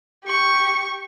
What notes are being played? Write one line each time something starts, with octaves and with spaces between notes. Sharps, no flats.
G4 C#6